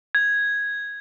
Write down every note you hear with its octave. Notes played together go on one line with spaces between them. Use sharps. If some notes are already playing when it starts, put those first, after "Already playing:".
G#6